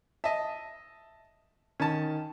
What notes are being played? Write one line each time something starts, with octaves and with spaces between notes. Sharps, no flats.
D#5 E5 A5
D#3 C#4 A5